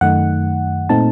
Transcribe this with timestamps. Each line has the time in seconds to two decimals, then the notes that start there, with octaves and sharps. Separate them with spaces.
0.01 F#2 D#3 A3 D#4 F#5
0.89 A#2 A3 C4 D#4 A5